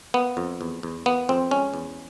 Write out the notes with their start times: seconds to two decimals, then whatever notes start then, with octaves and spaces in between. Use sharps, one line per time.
0.14 A#3 B3
0.37 F2
0.61 E2
0.83 E2
1.06 A#3 B3
1.29 F2 C4
1.51 G#3 C#4
1.74 E2